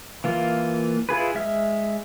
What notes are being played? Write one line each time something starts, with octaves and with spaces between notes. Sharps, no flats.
E3 A#3 F4
E4 F4 G#4 B4
G#3 E5 F6